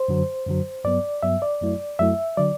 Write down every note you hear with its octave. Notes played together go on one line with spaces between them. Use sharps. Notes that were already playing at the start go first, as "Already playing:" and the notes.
Already playing: C5
F#2 D3 F#3
F#2 D3 F#3
G2 F#3 B3 D5
G2 F#3 B3 E5
D5
F#2 F#3 A3 E4
F#2 F#3 A3 E4 E5
D3 F#3 D5